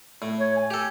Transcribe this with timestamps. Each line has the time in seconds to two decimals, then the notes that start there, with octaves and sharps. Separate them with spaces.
0.22 A2
0.40 C#5
0.56 G#5
0.70 G4 A4